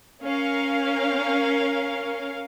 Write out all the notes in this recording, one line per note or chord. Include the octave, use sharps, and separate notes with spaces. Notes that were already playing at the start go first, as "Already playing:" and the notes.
C#4 A#4 F5